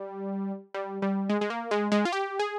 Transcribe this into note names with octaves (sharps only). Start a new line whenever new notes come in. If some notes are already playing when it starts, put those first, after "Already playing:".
Already playing: G3
G3
G3
G#3
G#3
A#3
G#3
G#3
F4
G4
G#4